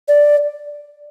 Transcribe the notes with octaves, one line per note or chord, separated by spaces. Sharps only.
D5